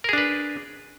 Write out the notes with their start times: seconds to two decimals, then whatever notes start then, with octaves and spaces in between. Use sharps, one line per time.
0.04 A#4
0.09 G#4
0.13 D4
0.18 B4